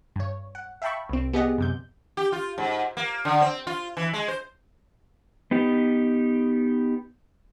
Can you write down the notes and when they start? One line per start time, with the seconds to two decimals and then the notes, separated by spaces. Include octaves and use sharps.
0.16 G2 C#5
0.55 F#5
0.82 E5 F5 G5 A5 B5 C#6
1.09 C2 C4
1.33 B3 G4 G#4 D5 D#5 F#5
1.58 F#2 C3 G6
2.17 G4
2.32 F4
2.58 G#2
2.97 A#3
3.25 D3
3.41 C4
3.67 F4
3.97 E3
4.13 G#3
4.28 C5
5.51 B3 D#4 G4